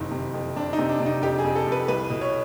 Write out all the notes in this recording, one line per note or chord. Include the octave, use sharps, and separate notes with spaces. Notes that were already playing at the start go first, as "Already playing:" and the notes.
Already playing: F#1 F2 C3 D#3
C3
F2
C3 D4
D#4
C3
D4
C3
D#4
F2 G4
G#4
F2
A4
F2
B4
C2 B4
B2
C#5